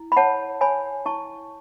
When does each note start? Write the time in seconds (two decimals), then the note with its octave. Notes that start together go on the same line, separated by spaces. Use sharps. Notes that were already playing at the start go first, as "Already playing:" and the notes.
Already playing: E4
0.12 B5
0.17 C#5 F#5 A5
0.61 C#5 G#5 B5
1.06 E4 A5 C#6